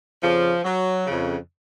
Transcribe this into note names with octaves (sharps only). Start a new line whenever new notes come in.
F2 C#3 F3
F#3
F2 C#3